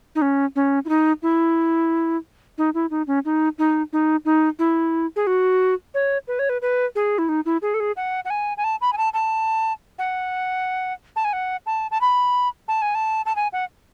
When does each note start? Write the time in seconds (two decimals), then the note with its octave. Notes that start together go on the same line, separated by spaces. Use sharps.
0.15 D#4
0.22 C#4
0.56 C#4
0.85 E4
0.89 D#4
1.22 E4
2.58 D#4
2.74 E4
2.90 D#4
3.07 C#4
3.25 D#4
3.58 D#4
3.93 D#4
4.25 D#4
4.59 E4
5.16 G#4
5.27 F#4
5.94 C#5
6.28 B4
6.39 C#5
6.49 B4
6.62 B4
6.95 G#4
7.18 E4
7.29 D#4
7.46 E4
7.62 G#4
7.74 A4
7.80 G#4
7.97 F#5
8.25 F#5
8.30 G#5
8.57 G#5
8.64 A5
8.81 B5
8.93 G#5
8.97 A5
9.14 A5
9.99 F#5
11.16 A5
11.24 G#5
11.33 F#5
11.66 A5
11.91 A5
12.01 B5
12.68 A5
12.82 G#5
12.95 A5
13.26 A5
13.36 G#5
13.53 F#5